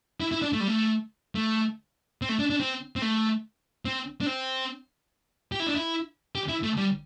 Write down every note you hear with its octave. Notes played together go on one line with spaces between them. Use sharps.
E4
E4
D4
A3
G3
A3
A3
C4
A3
D4
D4
C4
C4
A3
C4
D4
C4
G4
E4
D4
E4
G4
E4
A3
G3